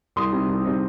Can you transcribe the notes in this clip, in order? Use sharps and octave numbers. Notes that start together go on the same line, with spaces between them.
C2 C6 D#6
C3 G3 C4 D#4
C2
C3 G3 C4 D#4